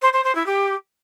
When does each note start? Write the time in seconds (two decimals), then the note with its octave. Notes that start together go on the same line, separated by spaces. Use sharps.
0.01 C5
0.12 C5
0.24 C5
0.35 E4
0.46 G4